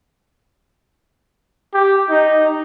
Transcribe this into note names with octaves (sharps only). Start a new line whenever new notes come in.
G4
D#4